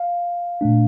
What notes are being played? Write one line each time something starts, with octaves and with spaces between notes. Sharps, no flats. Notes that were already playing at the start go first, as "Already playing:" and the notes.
Already playing: F5
A#2 A3 D4